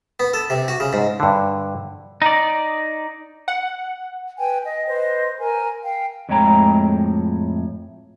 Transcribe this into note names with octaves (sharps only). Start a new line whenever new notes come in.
B3
A4
C3
F#4
C#3
G#2
G2 D3
D#4 D5
F#5
B4 G5 G#5
D#5
B4 C5 D#5
A#4 G#5
F5 G5
F2 A2 G#3 C#5 G5 A#5